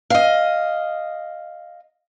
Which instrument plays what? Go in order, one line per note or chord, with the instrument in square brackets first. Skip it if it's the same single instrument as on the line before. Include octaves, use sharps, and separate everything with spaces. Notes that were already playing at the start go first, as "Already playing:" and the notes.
[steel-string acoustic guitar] D#5 F5